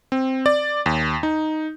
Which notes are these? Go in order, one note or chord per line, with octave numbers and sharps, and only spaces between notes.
C4
D5
D#2
D#4